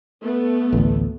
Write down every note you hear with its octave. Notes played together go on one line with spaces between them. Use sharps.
A3 B3
A1 D2